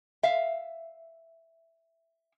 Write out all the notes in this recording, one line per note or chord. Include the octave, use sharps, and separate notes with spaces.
E5 F5